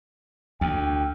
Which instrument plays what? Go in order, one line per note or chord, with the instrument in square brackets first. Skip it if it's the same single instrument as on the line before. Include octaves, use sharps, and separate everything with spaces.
[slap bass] D2 [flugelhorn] G5